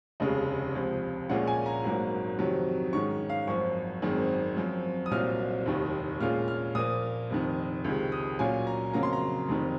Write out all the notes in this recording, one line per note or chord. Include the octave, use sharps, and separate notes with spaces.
F1 D#2 C#3 G#3 D#5
C#2 C3 F3
A#1 A#2 G#3 C#4 F4 F#5
G#5
A#5
G#1 G#2 F#3 A#3
F2 C3 D#3 F#3 C4
G#2 D#3 G#3 C#4 C#6
F5
G#1 F#2 F3 C#6
G#1 F#2 D#3 G#3 C4
F#2 F3 C4
D#6
C2 A#2 F#3 C4 F6
F1 D#2 D#3
A#2 G#3 C#4 F4 F6
F6
A#2 F3 A#3 D#6
F1 F2 D#3
C#2 C3 D#3 G#3
D#6
A#2 F#3 C#4 F4 G#5
A#5
F2 C#3 F#3 A#3 A#5
C6
A#5
F1 F2 D#3